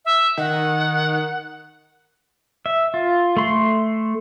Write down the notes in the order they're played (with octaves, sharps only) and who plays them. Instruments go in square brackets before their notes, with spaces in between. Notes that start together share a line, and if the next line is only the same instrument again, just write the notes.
[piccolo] E5
[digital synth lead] D#3 [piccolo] F#5
[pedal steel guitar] E5
F4
A3 C6